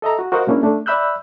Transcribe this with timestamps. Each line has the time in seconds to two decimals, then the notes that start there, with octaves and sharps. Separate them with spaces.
0.02 A4 D#5 E5 A#5
0.19 F#4
0.32 F#4 A#4 C5 D#5 F5 F#5
0.47 B2 G#3 A#3 C#4 D4 E4
0.63 A3 D4
0.86 D5 E5 B5 E6 F#6 G6